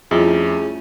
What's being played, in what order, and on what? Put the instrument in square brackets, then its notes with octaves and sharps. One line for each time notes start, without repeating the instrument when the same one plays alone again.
[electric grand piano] F2 [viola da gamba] G3 A3 C#4 [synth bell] E4 F4 E5 [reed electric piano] G#4